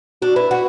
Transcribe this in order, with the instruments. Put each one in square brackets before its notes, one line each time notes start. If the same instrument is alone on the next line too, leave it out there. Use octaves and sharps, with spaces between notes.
[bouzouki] D4 [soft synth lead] F#4
[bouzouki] E4 [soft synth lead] B4
[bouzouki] F#4 [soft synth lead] B4